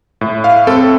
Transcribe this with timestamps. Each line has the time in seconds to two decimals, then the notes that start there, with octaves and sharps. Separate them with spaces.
0.21 A2
0.44 F5
0.67 C4 A4